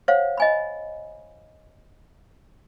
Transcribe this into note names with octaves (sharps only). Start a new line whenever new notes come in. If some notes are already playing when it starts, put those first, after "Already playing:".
C5 C#5 F5 F#5
D#5 G#5 B5